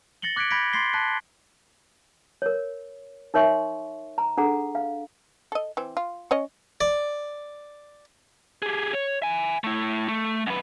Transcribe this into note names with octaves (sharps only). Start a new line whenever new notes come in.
A6 A#6 C#7 F#7 G7
D6 F#6 G#6 B6 C#7 D7
B5 G6 G#6 A#6 B6 D7
C6 A6 B6 C7 G7
A5 F#6 B6
A#4 C#5
D#4 A#4 C#5 E5 C6 C#6
A#5
D4 G#4 A4 F#5 A#5
F5
A4 D#5
E3 C4
F4
C#4 C#5 D#5
D5
G4 G#4
C#5
E5 G#5
A3 E4
A3
F#2 B4